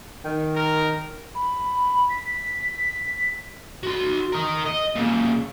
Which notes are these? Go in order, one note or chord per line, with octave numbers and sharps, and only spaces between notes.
D#3
A#4
B5
B6
F#4 C6
A#4 D#5
D#5
A#2 C#3